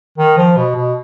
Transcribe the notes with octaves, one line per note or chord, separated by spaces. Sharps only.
D#3
F3
B2
B2